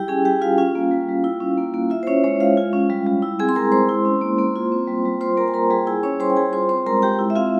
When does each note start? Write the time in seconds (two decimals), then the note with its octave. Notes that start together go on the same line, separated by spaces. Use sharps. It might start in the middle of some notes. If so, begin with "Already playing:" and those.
Already playing: G3 E4 G4 G5
0.08 C#4 G#4 G#5
0.25 G3 G4 G5
0.41 G3 F4 F5
0.58 C#4 F4 F5
0.75 A#3
0.91 G3
1.09 G3
1.24 E4
1.40 C#4
1.58 A#3
1.74 A#3
1.90 E4 F4 E5
2.03 C5
2.07 C#4 C#5
2.24 G#3 C#4 C#5
2.40 G#3 F4 F5
2.57 F4
2.73 C#4
2.90 G3
3.06 G3
3.22 E4
3.39 C4 G#4 G#5
3.49 C6
3.55 G#3 A#4 A#5
3.72 G#3 C5 C6
3.89 E4
4.05 C#4
4.21 A#3
4.39 A#3
4.56 F4
4.72 C4
4.87 G3
5.05 G3
5.21 F4 C5 C6
5.37 A#3 A#4 A#5
5.48 G#5
5.54 G3 A#4 A#5
5.70 G3 G#4 G#5
5.87 E4 G#4 G#5
6.03 C#4 C#5 C#6
6.20 G3 C5 C6
6.30 G5
6.37 G3 G#4 G#5
6.53 F4 C5 C6
6.69 C4 C5 C6
6.86 G#3 A#4 A#5
7.02 G#3 G4 G5
7.19 E4
7.30 E5
7.36 C4 F4 F5